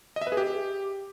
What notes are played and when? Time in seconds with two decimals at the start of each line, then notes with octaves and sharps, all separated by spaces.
0.16 D#5
0.22 E5
0.27 B4
0.32 G#4
0.37 G4